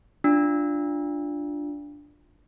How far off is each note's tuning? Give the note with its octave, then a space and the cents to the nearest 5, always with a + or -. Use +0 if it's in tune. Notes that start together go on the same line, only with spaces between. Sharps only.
D4 +0 F4 +0